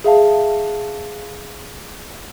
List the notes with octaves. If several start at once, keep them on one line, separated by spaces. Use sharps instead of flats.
G#4 E5 F5 A5